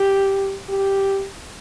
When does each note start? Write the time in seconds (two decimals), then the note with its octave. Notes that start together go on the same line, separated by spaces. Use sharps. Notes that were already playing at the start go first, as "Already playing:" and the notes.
Already playing: G4
0.69 G4